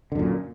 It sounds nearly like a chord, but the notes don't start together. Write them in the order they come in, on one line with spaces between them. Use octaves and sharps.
D3 F#2 A#2